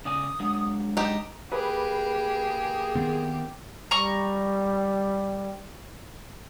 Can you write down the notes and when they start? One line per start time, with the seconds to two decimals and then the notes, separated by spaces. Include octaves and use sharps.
0.05 C#3 D5 G#5 D#6
0.40 F#3 G#3 D4
0.97 D#4 G4 A5
1.52 A#3 G4 G#4 B4
2.95 D#3 B3 C4
3.91 G3 A#5 C#6